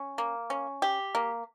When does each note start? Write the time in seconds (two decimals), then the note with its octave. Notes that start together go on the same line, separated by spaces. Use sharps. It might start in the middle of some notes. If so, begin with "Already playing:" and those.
Already playing: C#4
0.18 A#3
0.50 C#4
0.82 G4
1.15 A#3